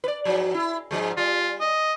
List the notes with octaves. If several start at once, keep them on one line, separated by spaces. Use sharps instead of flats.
B4 D5
G#2 F3 F#3
E4
G#2 F3 G#3
G3 F4
D#5